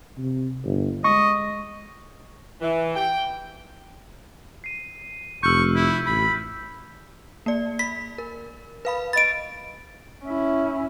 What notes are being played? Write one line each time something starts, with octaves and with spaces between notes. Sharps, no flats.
C3
G1
G#3 D#5 C#6
E3
G5
C7 D#7
F1 C#6 E6 F6 G6
E4
A1 B5
A#3 D5
B5 B6
A#4
B4 F5 B5
D#5 B5 A6 D7
C#4 E4